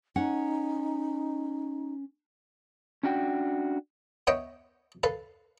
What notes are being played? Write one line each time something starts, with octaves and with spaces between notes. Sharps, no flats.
C#4 D#4 F#5
C#4 D4 F#4 G5
B3 C#5 D#5 E5 F#5 G5
A4 B4 F5